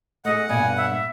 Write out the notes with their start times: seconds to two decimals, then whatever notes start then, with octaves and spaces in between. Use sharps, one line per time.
0.25 A3 G#4 D#5 F#5
0.49 G2 B2 A#3 G#5
0.77 E5